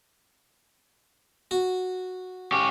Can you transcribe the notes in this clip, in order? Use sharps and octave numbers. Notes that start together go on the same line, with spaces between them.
F#4
C#4 G4